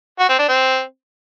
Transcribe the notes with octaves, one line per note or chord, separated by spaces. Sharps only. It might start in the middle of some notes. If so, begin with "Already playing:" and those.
F#4
C4
D4
C4